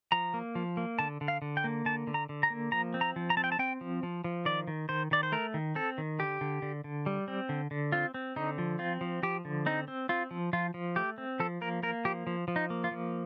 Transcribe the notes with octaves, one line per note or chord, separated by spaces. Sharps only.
F3 A#5
A#3
F3
A#3
D3 A5
D3
F5
D3
G5
A#3
D3 A5
D3
A#5
D3
A#5
A#3
F3 A#5
C4
A#5
F3
A#5
C4 A5
G5
A5
C4 G5
F3
F3
F3
D#3 D5
D#3
D#3 C5
D#3 D5
C5
A3 A#4
D#3
C4 A4
D#3
D3 G4
D3
D3
D3
G3
C4
D3
D3
C4 F4
C4
D3 D#4
F3
C4 F4
F3
F3 G4
D3
C4 D#4
C4
C4 F4
F3
F3 F4
F3
A3 G4
C4
F3 A4
A#3 A#4
A#3 A#4
F3 G4
F3
F3
D#4
A#3
F4
F3